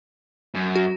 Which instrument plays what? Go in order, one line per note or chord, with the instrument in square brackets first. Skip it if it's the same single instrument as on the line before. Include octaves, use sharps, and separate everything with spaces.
[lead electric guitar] F#2
[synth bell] F#4